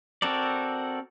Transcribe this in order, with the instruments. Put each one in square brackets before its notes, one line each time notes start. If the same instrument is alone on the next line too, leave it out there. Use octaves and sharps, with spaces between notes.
[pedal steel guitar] C4 F#4 A4 A#4 D5